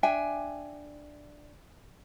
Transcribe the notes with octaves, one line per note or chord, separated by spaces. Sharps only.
D4 E5 G5 G#5